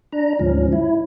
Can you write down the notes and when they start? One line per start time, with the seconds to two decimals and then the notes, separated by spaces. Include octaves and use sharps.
0.12 D4 A#5
0.39 D2 G#2 F3 C#4
0.72 E4